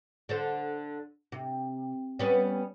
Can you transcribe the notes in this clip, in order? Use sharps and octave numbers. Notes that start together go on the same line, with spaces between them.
D3 A4 C5
C3
G3 B3 C#4